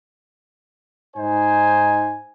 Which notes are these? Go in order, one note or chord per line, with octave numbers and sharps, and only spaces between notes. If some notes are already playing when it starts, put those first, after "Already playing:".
G#2 D#4 C5 G#5